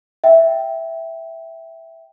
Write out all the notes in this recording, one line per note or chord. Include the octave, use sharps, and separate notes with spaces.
E5 G5